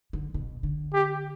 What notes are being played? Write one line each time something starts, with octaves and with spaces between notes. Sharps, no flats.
D3
B2
D3
G4